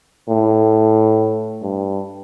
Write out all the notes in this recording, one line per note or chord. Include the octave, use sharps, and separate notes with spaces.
A2
G2